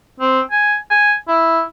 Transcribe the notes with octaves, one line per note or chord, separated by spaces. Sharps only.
C4
G#5
G#5
E4